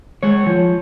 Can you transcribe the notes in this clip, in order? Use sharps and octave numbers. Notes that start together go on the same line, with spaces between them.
G#3 C#5
F3